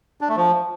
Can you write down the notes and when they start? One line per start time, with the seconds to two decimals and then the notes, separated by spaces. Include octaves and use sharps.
0.21 D4
0.29 A3
0.37 F3